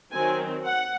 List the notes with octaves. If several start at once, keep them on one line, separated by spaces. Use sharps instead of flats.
D#3 F#3 C4 G#5
F#5